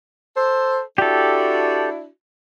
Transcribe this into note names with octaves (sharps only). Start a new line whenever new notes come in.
A4 C5
D4 E4 F#4 G4 A4